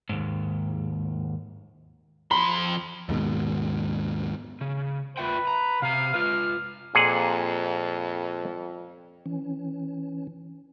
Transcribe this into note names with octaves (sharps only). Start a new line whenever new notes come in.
D#2 G#2
F2 B5 C6
D#2 G#2 B2
C#3
F4 B4 E5 G5
A#5
C3 F5 A#5
F4 B4 F6
F2 A#2 G#4 F#5
E3 C#4